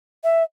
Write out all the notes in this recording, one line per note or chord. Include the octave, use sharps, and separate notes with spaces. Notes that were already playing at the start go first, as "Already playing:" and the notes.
E5